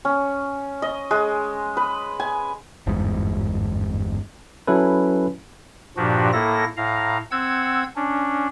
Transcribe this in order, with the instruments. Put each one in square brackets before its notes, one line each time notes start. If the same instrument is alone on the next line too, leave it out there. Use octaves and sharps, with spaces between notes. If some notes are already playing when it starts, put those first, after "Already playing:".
[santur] C#4
D#5
G#3
B4
G#5
[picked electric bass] G1 E2 G#2
[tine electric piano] F#3 C#4 E4 A4 B4
[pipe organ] G2 A#2 F3 D4 F#4 G4
A2 A#3 E4 A4 A#6
A2 F5 A#5
C4 F#5 E6 G#6
C#4 D4